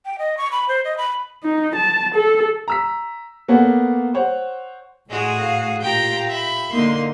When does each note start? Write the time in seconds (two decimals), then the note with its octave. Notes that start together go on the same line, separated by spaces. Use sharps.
0.05 G5
0.19 D#5
0.38 C#6
0.52 B5
0.69 C5
0.85 D#5
0.98 B5
1.44 D#4
1.76 A5
2.15 A4
2.68 A#5 E6 B6
3.48 A#3 B3 A4 C#5 F#5
4.14 C5 C#5 F#5
5.10 A2 G#3 F#4 G#4
5.40 F5
5.81 A#2 F4 G4 G5 A#5
6.29 E5 B5
6.72 D3 A#3 D#4 C6